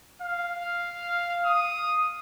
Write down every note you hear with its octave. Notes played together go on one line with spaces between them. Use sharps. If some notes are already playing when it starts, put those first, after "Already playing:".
F5
D#6